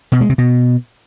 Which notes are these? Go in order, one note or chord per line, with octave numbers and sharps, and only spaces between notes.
B2
G#3
C3
B2